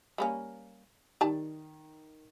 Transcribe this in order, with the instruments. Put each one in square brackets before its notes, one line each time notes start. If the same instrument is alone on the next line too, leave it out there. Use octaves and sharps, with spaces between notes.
[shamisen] G3 A#3 C#4
[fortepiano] D#3 [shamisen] G4 D5 A5